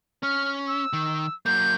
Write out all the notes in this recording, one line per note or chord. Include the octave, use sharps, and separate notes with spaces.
C#4 F6
E6
D#3
F#3 A#3 G6